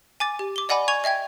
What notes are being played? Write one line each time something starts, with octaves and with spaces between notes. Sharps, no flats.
G#5 D6 A6
G4
D6 G7
D5 D#5 F#5 G#5 B5 D6
G#5 C#6 G#6 F7
D#5 E5 G5 G#6